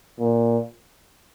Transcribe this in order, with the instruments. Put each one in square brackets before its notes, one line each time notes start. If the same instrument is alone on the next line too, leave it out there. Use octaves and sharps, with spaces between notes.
[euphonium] A#2